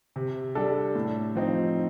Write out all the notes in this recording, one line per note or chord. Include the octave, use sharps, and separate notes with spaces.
C3
G3 D4 A4
A2
F3 C4 D#4